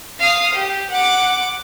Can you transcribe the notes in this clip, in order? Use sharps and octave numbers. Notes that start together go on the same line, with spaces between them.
F5 D#6
G4
F#5 D6